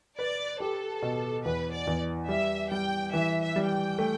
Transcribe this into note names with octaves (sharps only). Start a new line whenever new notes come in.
B4 D5
G4 A4
B2
E2 B4
D5
E2
G3 E5
G3 G5
E3 E5
E5
G3
G5
A3